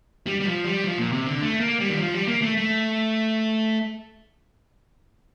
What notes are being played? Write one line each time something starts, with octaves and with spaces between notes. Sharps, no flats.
G3
G3
F3
G3
F3
A#2
C3
D3
A3
A#3
G3
D#3
F3
G3
A#3
A3
A3